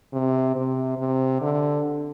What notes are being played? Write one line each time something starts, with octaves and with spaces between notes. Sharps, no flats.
C3
C3
C3
D3